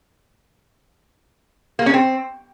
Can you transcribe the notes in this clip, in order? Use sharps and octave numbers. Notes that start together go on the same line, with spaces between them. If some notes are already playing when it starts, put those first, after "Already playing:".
A#3
C#4
C4